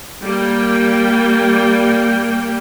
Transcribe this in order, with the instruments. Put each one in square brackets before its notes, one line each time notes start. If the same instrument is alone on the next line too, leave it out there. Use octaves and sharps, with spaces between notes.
[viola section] G3 A#3 G5